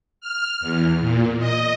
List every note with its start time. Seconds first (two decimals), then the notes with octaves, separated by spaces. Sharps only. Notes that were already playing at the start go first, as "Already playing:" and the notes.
0.21 F6
0.61 E2
1.00 A#2
1.39 D#5